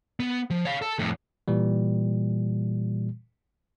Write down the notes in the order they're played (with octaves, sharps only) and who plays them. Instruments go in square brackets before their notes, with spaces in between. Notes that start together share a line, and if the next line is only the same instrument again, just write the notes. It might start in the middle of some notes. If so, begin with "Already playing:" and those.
[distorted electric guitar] B3
F3
C#5 F5
A4
F2 A2
[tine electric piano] A#2 E3 G3